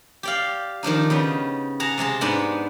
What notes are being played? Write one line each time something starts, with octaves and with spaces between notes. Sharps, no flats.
G4 D5 F5
D#3 F3 D4 D#4
C#3 B3 G5
G#4 F#5 A5 A#5
C3 G#3 G#4 A5
G#2 B3 D4 F#5